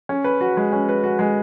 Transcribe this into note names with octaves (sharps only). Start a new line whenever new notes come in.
C#4
B4
F#4
G#3
C#4
B4
F#4
G#3